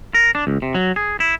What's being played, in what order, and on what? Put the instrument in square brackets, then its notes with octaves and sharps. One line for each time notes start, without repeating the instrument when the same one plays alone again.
[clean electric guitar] A#4
D4
C#2
C3
F#3
G#4
E4